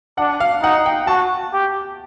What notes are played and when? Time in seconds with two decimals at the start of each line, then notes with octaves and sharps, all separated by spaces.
0.18 D4 F#5
0.40 F5
0.62 D#4 F#5
0.86 G5
1.07 F#4 A5
1.53 G4